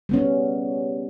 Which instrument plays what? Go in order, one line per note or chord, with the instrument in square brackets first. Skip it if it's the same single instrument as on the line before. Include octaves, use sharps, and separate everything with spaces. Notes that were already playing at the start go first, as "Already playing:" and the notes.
[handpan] G3 B3 C#4